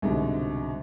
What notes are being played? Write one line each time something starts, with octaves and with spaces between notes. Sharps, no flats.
C2 G#2 B2 D3